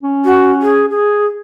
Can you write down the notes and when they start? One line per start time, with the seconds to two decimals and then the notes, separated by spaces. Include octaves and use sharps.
0.03 C#4
0.25 F#4
0.62 G#4
0.91 G#4